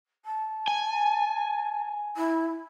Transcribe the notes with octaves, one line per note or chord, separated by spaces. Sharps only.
A5
G#5
E4